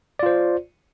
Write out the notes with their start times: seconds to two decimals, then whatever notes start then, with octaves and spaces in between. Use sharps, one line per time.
0.19 D5
0.23 F4
0.26 C5